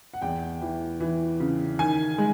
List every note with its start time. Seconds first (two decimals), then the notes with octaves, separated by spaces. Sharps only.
0.14 F#5
0.22 E2 G5
0.61 E3
1.00 E3
1.40 C#3
1.79 D#3 G#5
2.18 G#3